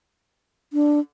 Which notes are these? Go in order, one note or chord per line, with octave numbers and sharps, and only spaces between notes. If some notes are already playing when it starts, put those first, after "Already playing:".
D4